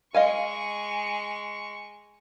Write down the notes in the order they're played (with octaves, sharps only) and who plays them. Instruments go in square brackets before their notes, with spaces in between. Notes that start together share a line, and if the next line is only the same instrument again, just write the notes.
[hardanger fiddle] G#3 C#6 [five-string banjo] D#5 F5 G#5